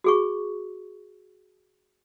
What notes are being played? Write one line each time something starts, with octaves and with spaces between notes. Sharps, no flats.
F#4 G#4 C#6